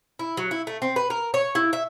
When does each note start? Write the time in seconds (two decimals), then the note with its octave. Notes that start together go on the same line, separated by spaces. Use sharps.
0.19 E4
0.37 F#3
0.51 E4
0.67 A3
0.82 C4
0.96 B4
1.10 A#4
1.34 C#5
1.55 E4
1.73 E5